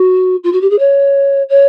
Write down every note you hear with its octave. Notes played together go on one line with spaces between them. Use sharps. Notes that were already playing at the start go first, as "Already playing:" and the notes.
Already playing: F#4
F4
F#4
G4
G#4
C#5
C#5